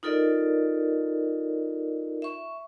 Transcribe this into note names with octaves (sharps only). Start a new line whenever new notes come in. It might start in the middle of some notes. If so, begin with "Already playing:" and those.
D#4 F4 A4 A#4 D5 D#5
E5 C#6